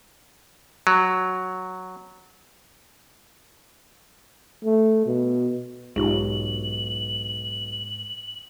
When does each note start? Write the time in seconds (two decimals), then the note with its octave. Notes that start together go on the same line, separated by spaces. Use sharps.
0.87 F#3
4.64 A3
5.06 B2
5.96 B1 G#2 D#4 F4 G4 F#7